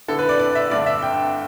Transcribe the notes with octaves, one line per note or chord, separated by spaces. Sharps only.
D3 B3 E4 A4
B4
D5
D5
E5
G2 D3 A3 D4 D5
E5
G5